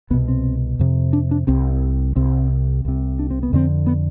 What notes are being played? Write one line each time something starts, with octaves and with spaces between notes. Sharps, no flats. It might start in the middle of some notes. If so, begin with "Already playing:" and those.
C2 B2 B3
C4
F2 C3
D4
D4
C2 C3 C4
C2 C3 C4
C2 C3
D4
C4
B3
F2 D3 C4
B3